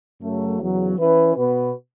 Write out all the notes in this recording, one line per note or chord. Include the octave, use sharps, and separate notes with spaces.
F#2 C#3 F#3 A3
E2 C#3 F#3
E3 C#4 E4 B4
B2 B3 F#4 B4